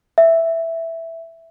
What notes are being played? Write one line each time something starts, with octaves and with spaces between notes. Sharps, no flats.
E5